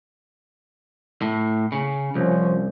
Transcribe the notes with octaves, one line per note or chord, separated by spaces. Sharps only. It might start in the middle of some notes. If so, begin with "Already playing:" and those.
A2
C#3
C2 F3 C#4